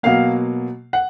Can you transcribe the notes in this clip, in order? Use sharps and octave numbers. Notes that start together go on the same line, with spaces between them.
B2 F#3 A#3 F5
F#5